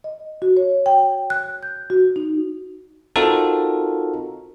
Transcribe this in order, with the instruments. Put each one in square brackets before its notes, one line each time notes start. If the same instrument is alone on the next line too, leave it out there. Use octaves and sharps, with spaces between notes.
[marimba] D#5
F#4
C#5
G5
F#6
G6
F#4
D#4
[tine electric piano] C4 D#4 F4 F#4 A4 A#4